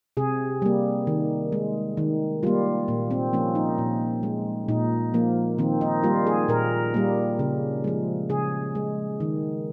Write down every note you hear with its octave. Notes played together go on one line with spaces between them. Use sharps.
C3 G#4
G3 A#3
D#3
G#3
D#3
G3 A#3 F4
A#2 A#3
C4
F3 A#3 C#4
D#4
A#2
G#3
A#2 D#4
F3 A#3
D#3 C4
D#4
G3 A#3 F4
G#4
A#2 A#4
G3 A#3
C#3
F3 G#3
C#3 G#4
G#3
D#3